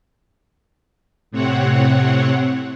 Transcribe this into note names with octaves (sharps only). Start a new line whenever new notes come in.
A2 C3 C4 C#5 F#5